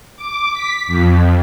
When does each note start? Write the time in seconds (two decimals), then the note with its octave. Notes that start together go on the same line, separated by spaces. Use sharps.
0.16 D6
0.53 B6
0.88 F2